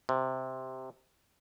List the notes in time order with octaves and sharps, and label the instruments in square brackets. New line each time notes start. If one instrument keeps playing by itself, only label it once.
[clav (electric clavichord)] C3